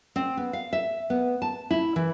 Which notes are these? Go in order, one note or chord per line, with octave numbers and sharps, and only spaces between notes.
C4
B3
F5
E5
B3
A5
E4
E3